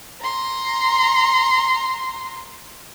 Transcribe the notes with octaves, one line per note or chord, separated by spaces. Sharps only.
A#5 C6